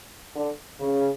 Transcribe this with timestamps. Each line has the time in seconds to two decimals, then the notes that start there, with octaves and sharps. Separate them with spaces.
0.35 D3
0.81 C#3